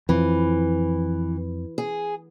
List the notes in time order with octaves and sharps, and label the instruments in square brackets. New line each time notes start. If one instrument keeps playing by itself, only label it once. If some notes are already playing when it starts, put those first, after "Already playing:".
[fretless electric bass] F2 F3 [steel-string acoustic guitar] E3
[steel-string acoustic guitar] G#4